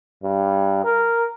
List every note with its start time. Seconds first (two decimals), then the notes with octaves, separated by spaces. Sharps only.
0.23 G2
0.85 A#4